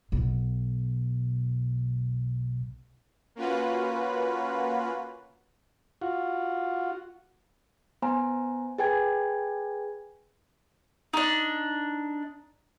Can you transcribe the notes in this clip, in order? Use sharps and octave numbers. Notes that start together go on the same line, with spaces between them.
B1 B2
A#3 C#4 F4 F#4 B4
F4 F#4
B3 C5 G#5 A#5
G#4 B4 G5 G#5 G#6
D4 D#4